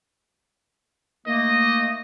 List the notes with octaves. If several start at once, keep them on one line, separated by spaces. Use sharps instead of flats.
D#3 A3 A#3 D#5